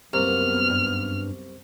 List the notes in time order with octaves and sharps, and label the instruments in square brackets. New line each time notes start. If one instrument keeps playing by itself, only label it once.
[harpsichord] C2 [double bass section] F#2 B3 [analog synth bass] A#3 [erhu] F6
[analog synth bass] G2